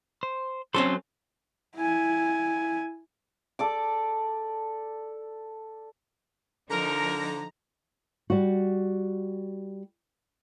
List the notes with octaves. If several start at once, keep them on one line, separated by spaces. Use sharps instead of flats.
C5
F#3 C4 C#4 A4 C5 C6
E4 G#5
A4 D5 D6
D3 F3 D#4 A#4 A#5
G3 F#4